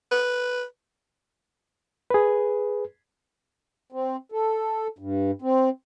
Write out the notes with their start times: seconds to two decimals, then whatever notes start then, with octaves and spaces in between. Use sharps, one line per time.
0.11 B4
2.10 G#4 B4
3.92 C4
4.32 A4
4.99 G2
5.42 C4